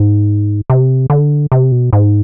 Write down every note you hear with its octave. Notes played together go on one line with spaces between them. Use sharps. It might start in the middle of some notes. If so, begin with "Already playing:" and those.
Already playing: G#2
C3
D3
C3
B2
G#2